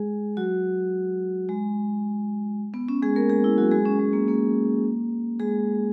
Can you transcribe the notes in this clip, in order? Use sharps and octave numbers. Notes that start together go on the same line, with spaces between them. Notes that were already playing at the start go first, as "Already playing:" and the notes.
Already playing: G#3 G#4
F#3 F#4
G#3
B3
C#4
G#3 G#4
A#3 A#4
G#3 G#4
E4
F#3 F#4
G#3 G#4
C#4
G#3
A#3
A#3
G#3 G#4